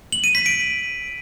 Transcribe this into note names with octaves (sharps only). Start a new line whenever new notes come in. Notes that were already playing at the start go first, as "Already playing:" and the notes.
F#7
D#7
B6
D7